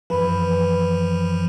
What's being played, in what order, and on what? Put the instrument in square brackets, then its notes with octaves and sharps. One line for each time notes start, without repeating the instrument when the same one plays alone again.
[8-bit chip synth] F#2 E3 F3 [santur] B4